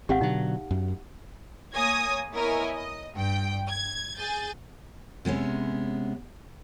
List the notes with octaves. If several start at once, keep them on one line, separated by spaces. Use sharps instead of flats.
G#1 C4 G4 F5 F#5
B2 D3 F#3 D#4
F#2
A#3 C#5 G#5 D#6 G#6 A#6
B3 E4 A#4 C#5 D#5 G#5
D#5
G2 G5
G#6
G#4 G#5 G6 A6
C3 G#3 B3 C#4